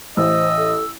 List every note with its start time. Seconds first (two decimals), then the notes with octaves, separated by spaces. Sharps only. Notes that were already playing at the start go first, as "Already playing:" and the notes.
0.17 A1 C5 D#5 E6
0.58 A4